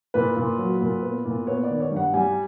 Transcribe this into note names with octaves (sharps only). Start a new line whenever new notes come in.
A#2 B4
A#2
F#3
A#2
B3
A#2
B3 C#5
D5
D#3
C#5
G2
F#5
G3 G#5